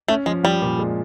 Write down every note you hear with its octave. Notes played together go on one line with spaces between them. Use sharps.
A3 C#4
F3 G#3
F3 G3
A#2
G#3